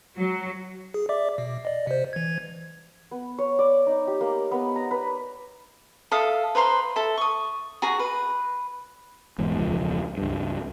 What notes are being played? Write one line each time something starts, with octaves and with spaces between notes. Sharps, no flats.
F#3
G#4
D5 E5 D6
B2
D5 D#5
C3 C5
E3 G#6
B3
C#5
D5
D#4
G4
A#3
B3
A#5
B4
A4 E5 F5 D#6
B4 C5 A#5 C6
A4 E5
C#6 D#6
F#4 G#4 A#5
B4
E1 E2 G#2
E1 C#2 F3
C#2 G2